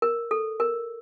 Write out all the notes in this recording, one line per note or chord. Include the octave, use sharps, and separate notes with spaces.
A#4
A4
A#4